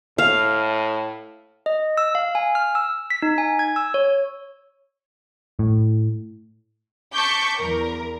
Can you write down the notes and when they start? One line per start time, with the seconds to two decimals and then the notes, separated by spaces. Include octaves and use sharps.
0.18 A2 F5
1.66 D#5
1.97 E6
2.15 F5
2.35 G#5
2.55 F6
2.75 E6
3.10 B6
3.22 D#4
3.38 G#5
3.59 G#6
3.76 E6
3.94 C#5
5.59 A2
7.13 A5 C#6 D6 G6 B6
7.57 E2 A#4